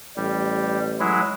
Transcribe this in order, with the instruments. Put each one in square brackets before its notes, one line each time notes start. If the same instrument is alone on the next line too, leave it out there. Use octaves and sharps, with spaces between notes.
[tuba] A1 [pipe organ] G3
[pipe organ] F#3 G#3 E4